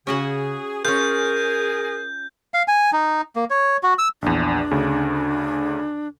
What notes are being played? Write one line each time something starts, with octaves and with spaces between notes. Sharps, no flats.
C#3 C#4 F#4 G#4 F#5
C#4 F4 G#4 A#4 G6
F5
G#5
D#4
A#3
C#5
F#4
E6
A#1 E2 D4
D2 C#3